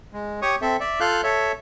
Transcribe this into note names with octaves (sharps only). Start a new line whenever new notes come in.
G#3
G4 C#5 C#6 D#6
C4 A4 E5
D5 E5
F4 A4 F5 F#6 G6
A4 C#5 E5